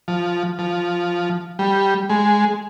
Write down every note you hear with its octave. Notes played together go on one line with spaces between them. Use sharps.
F3
F3
G3
G#3